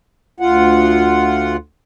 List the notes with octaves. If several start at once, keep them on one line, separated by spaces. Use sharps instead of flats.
D2 F4 F#5